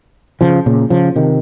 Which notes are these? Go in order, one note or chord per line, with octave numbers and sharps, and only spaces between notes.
C#3 F3
A#2 C#3
C#3 F3
C3 D#3